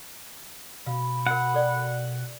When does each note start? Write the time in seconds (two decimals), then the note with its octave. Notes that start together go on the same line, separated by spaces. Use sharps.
0.86 B2 F5 B5
1.27 F#4 A#4 F#5
1.54 A4 D5 G5